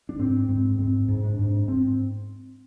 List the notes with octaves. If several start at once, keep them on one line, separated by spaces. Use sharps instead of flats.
D4
G#2 C4
G#2 C4
G#2 C4
G#2
D4
G#2
G#2 C4